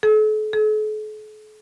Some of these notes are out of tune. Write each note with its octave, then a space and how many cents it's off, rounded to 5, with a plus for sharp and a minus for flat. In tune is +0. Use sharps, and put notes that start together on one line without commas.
A4 -40
A4 -45